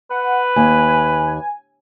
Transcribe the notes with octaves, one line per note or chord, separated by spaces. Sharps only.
B4 F#5
D#2 G#5